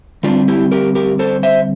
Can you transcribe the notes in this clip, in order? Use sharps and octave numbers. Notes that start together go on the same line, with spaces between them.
D3 G3 C4 D4 F4
E4 G4
G4 A#4
G4 A#4
A4 C5
C5 E5